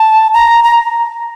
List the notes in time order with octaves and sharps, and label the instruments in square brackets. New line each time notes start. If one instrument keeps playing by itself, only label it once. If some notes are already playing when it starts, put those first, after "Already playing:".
Already playing: [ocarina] A5
A#5
A#5